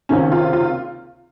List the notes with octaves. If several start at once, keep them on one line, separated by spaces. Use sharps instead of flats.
C#2 C3 D#3 C#4
F4
F4